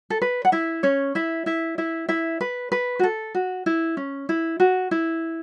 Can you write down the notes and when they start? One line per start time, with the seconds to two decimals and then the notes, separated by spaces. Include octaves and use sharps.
0.10 A4
0.22 B4
0.45 F#5
0.52 E4 E5
0.83 C#4 C#5
1.15 E4 E5
1.46 E4 E5
1.78 E4 E5
2.08 E4 E5
2.41 B4
2.72 B4
2.99 F#4
3.03 A4
3.35 F#4
3.66 E4
3.97 C#4
4.29 E4
4.60 F#4
4.91 E4